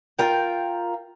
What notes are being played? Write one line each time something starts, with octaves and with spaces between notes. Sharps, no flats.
F4 A#4 G5